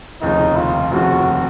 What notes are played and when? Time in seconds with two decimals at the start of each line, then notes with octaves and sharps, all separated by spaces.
0.22 F1 D#2 C#3 F3 D#4
0.56 F4
0.92 F1 D#2 C#3 F3 F#4